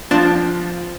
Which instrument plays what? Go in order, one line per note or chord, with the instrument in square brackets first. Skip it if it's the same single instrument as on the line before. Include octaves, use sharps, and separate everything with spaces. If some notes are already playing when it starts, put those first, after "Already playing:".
[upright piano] F3 [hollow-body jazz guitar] C4 F4 C5 [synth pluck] D4